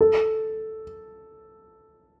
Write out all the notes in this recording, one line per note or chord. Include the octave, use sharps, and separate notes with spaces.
A4